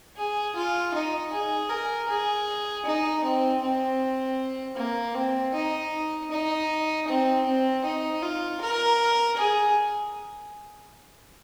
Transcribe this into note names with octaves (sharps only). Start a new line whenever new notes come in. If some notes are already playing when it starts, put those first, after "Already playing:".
G#4
F4
D#4
G#4
A#4
G#4
D#4
C4
C4
A#3
C4
D#4
D#4
C4
C4
D#4
F4
A#4
G#4